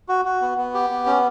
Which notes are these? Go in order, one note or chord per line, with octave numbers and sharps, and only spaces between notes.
F#4
F#4
B3
B3
G4
B3
C#4